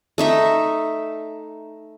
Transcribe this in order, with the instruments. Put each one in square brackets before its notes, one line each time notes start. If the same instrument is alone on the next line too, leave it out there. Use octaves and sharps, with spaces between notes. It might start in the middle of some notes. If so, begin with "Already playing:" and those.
[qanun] A3 D#4 E5